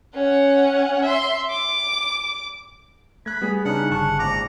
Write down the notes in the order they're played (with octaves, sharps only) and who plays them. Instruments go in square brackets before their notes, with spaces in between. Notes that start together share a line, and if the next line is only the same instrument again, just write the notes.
[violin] C#4 F#5
E5 C6
D6
[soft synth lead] A3 [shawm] B5 [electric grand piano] F#6 G#6
[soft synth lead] G3 [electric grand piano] B3 G#4
[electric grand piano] C#3 [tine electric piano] D4 D#4 [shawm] F#5
[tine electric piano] G1 A5 C#6 [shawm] F#5
[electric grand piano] A#1 G#2 D6 [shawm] A#5